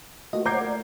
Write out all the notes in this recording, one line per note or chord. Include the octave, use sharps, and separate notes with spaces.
A3 A#3 F4 F#4 D#5
C5 C#5 F#5 A#5 D6 G6 G#6 C7
A3 A#4 D5